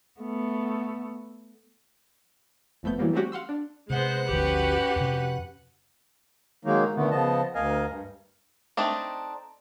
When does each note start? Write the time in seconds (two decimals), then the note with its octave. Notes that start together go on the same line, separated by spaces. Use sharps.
0.20 A3 B3
2.83 G1 F2 A3 B3 G6
2.98 E3 F#3 G3 A#3 B3
3.13 G3 A3 C4 C#4 F#4 G4
3.32 F5 F#5 C6 E6
3.49 D4
3.90 C3 G#3 B3 C5 F#5
4.29 G1 D2 F3 C#4 F#4 G4 B4
4.96 F2 C3
6.65 D#3 F#3 G#3 A#3 D#4
6.95 A#2 D3 D#3 A3 B3
7.11 C#3 F3 B3 D#5 A5
7.55 D2 A#4 D#5 F5 G#5
7.87 G2
8.77 A3 C4 D4 D#4